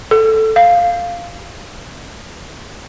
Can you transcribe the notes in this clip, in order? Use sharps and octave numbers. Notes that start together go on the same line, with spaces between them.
A4
F5